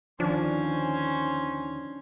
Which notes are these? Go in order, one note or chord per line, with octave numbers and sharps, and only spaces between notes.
D#2 D3 D#3 F3 C#4 D4 C5